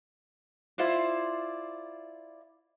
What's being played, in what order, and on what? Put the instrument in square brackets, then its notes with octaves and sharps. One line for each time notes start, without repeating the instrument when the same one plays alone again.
[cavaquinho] E4 F4 C5 D5